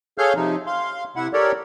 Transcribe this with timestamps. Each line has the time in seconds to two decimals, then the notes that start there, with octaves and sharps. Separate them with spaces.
0.18 G#4 A4 C#5 F5 F6 G6
0.36 C3 F3 D#4
0.67 F5 C6
1.16 C3 E4 F#5
1.33 G4 A4 A#4 C#5 D5